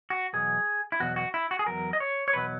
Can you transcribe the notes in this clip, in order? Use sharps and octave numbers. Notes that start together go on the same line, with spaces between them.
F#4
E2 B2 F#3 G#4
E4
E2 B2 F#3 F#4
F#4
E4
F#4
G#4
E2 B2 F#3 A#4
D#5
C#5
C#5
E2 B2 F#3 B4